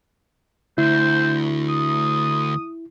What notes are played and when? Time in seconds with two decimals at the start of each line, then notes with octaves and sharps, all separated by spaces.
0.78 D2 E4 C5
1.69 D#6